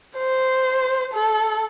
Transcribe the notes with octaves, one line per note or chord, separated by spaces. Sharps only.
C5
A4